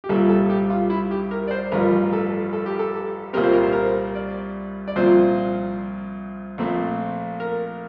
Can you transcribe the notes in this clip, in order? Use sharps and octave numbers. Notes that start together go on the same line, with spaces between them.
G4
C2 A#2 G3 A4
A4
G4
F4
E4
G4
A#4
D5
C5
A1 G2 F3 A#4
A4
A4
G4
A4
C2 A#2 G3 C4 A#4
C5
A#4
C5
A#4
D5
D5
C2 A#2 F3 C4 C5
A#1 A#2 A3 C4
A#4